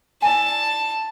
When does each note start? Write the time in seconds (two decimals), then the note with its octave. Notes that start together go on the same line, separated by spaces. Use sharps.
0.22 E4 D5 G#5 A5